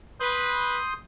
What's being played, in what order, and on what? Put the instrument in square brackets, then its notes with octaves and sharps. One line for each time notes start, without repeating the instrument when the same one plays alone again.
[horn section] B4 [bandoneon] C6 D#6 G6